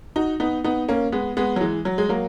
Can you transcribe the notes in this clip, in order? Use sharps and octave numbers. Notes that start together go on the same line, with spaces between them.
D#4 F#4
B3 D#4
B3 D#4
A#3 C#4
G#3 B3
G#3 B3
F#3
E3 G#3
F#3
G#3
F#3 A#3